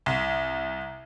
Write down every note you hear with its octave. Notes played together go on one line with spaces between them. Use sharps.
C2